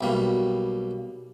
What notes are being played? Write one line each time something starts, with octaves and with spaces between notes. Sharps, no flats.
B1 B2 G3 A#3